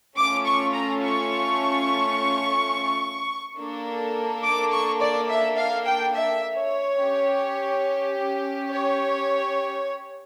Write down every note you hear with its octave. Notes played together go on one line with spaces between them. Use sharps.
A3 C#4 F4 A4 D6
C#6
A#5
C#6
A#3 D4 A4
D6
C#6
D5
E5
F5
G5
E5
C#5
C#4 G4
C#5